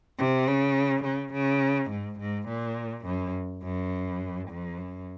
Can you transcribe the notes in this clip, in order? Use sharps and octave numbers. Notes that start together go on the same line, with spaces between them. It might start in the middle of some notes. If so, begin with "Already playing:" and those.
C3
C#3
C#3
C#3
G#2
G#2
A#2
F#2
F#2
F2
F#2